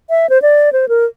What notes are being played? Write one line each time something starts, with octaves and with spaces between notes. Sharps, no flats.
E5
C5
D5
C5
A#4